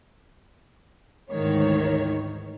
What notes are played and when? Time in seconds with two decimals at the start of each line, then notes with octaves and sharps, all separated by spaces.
1.31 D2 G#2 D#3 E3 C#5